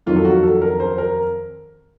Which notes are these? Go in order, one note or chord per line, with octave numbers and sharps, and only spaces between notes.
F2 D#3 F#3 F4
A4
F#4
A4
A#4
C5
A#4